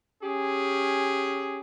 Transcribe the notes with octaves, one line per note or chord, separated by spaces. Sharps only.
C#4 G4 G#4